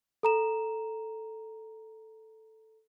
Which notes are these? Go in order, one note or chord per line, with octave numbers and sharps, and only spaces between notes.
A4 A#5 E7